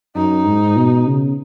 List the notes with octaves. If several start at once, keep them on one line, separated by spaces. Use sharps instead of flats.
F#2 D#4
G#2
B2
C#3